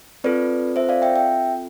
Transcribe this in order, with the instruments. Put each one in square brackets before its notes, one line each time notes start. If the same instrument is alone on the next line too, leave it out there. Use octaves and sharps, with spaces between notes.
[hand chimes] C4 F4 A4 B4 D5
C5 E5
D5 F5
E5 G5
E5 G5